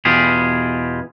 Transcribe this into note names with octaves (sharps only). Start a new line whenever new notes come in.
E2 B2 F4 G4 G#4